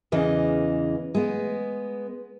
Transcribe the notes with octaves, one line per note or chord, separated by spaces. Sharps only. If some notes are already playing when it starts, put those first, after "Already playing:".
E2 C#3 E3 D#5
G#3 B3